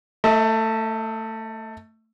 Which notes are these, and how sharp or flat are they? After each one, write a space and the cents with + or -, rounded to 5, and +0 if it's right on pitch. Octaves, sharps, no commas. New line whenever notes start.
A3 +20 E5 -40